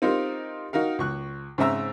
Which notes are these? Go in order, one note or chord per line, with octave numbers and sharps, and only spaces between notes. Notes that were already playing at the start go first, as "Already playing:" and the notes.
C4 D#4 F4 G4 A#4 C5
D#4 F#4 A#4 F5
C#2 C#6 F#6
G#2 C#3 C4 E5 A#5 E6